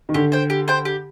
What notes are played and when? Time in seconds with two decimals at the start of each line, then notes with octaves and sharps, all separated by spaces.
0.09 D#3
0.14 D3 G4
0.32 C5 G5
0.50 G4
0.68 C5 G5
0.85 G4